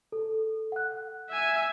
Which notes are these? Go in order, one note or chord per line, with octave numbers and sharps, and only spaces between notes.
A4
F#5 F#6
E5 G#5